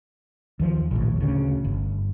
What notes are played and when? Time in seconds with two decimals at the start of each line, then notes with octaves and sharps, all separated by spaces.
0.60 D#2 F3
0.91 A#1 D#2 A2
1.20 D2 C#3
1.65 G1